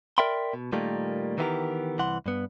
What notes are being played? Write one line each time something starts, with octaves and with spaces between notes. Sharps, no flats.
A#4 D5 E5 G5 B5 C6
B2
A#2 D#3 G3 A3 A#3
D#3 E3 B3 D#4 G4 A#4
C2 E3 F#5 C6
G2 B3